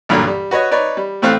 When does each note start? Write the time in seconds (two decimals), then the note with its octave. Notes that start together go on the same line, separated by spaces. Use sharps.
0.09 B1 G2 A#2 D3 F#3
0.27 G3
0.51 F#4 B4 C#5 D#5
0.71 D#4 B4 C#5 D5
0.97 G3
1.22 A2 A3 C4 F5 F6 F#6